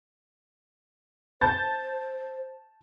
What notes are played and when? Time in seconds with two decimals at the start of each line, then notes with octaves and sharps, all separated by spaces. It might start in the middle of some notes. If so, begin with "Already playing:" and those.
1.41 C5 A5 G6 A6